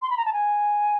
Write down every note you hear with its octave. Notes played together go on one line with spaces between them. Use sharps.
C6
B5
A#5
A5
G#5